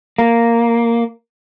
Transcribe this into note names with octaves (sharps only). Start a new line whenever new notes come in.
A#3